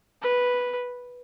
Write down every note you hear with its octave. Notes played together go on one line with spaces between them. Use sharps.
B4